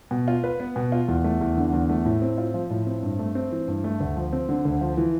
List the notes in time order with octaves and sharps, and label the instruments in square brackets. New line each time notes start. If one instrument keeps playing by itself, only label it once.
[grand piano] B2
F4
B4
B3
B2
F4
E2
A3
E2
D3
E2
A3
A2
C4
F4
F3
A2
C4
G2
A3
C4
E3
G2
A3
D2
F3
C4
D3
D2
F3
E3